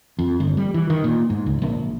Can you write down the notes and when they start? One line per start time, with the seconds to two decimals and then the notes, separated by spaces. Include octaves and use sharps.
0.19 F2
0.40 G1
0.57 G3
0.74 E3
0.90 D#3
1.04 A#2
1.30 G#2
1.46 C#2
1.62 A#1